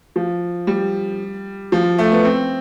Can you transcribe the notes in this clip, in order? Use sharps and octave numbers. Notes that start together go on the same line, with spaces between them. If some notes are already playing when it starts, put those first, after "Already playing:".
F3
G3
F3
A3
B3
C4